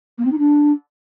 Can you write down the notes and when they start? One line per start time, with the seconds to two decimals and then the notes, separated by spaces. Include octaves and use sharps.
0.18 A#3
0.25 C4
0.32 D#4
0.38 D4